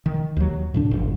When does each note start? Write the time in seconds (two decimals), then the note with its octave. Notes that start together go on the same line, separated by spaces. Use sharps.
0.06 D#3
0.36 D#2 F#3
0.74 A2 D3 D4
0.91 G1 F2